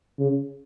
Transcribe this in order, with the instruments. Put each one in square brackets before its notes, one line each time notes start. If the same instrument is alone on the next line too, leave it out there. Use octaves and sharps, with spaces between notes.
[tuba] C#3